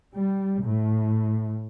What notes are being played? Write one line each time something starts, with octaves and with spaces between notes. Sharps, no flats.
G3
A2